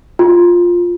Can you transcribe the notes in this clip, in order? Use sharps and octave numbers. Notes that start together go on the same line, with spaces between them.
F4